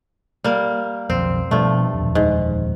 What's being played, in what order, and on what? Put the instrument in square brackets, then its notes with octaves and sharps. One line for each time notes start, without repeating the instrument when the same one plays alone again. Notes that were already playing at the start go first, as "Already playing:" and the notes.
[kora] G3 A#3
[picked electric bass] B1 F2 [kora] C4
[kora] G2 A3 [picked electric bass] B2 F3 G3
[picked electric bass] D#1 F2
[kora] G#2